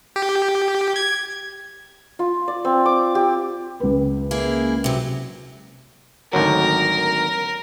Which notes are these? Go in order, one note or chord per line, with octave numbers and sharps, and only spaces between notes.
G4
G#6
F4
D5
C4
D6
G4
C#2 B4
A#3 E4 G#4
C3 F#3
G#1 D2 F#3 A#4